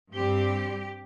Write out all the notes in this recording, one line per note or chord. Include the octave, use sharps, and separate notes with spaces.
G2 G3 C4 G4